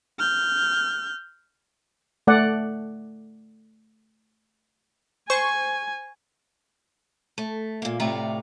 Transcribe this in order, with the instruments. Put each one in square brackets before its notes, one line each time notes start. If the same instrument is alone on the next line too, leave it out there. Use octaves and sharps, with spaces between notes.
[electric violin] F6 G6
[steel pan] A3 D5 F#5
[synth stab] C5 C#6 [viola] G#5
[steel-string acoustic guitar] A3
A#2 A#3
A2 C3 A3 F4 D5 A#5